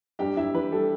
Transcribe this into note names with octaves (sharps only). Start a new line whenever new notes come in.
G2 G4 G5
G2 E4 E5
E3 B4
G3 A4